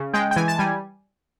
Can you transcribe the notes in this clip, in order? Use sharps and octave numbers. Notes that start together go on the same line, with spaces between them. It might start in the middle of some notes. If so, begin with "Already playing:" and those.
Already playing: C#3
G#3 G5
G5
E3 G#5
A5
G3 G#5